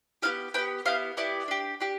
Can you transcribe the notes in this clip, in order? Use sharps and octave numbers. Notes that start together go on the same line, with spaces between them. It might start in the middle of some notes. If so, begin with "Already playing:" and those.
B3 E4 G4 F5
B3 E4 G4 G5
B3 E4 G4 F5
B3 E4 G4 D5
D4 G4
D4 G4